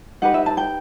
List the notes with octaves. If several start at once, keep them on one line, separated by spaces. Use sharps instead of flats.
D#4 G4 B4 F#5
E5
A5
G5